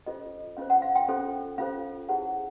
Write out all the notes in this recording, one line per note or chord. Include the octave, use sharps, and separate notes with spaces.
C#4 F4 A4 C5 D#5
C#4 F4 A4 C5 F5
F#5
F5
G5
C#4 F4 A4 C5
C#4 F4 A4 C5 F5
E4 G#4 C#5 F#5